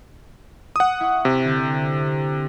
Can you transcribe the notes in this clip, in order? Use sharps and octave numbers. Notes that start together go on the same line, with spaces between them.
F#5 D#6
E4 C#6
C3
D3 G6 A6